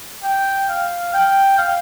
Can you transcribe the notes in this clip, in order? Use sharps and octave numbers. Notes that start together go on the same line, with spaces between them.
G5
F5
G5
F5